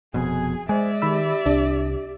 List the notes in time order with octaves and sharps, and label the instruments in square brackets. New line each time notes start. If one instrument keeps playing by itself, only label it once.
[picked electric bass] F1 F2 B2 [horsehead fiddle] G#4 G#5
[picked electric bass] G#3 [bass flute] C5 [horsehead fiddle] D5 E5 [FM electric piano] G#5
[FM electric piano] D#3 B5 E6 [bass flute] G4
[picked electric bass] C2 [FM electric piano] D4